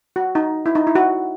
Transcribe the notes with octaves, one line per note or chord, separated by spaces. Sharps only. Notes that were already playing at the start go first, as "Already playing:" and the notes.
F#4
D#4
E4
D#4
E4
F#4